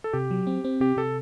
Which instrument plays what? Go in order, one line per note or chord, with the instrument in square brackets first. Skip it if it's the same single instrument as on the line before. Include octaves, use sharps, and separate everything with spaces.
[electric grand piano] A4
[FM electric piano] C3 [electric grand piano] G4
[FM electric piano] F#3
C4
C4
[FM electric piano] C3 [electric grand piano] G4
[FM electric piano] C3 [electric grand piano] A4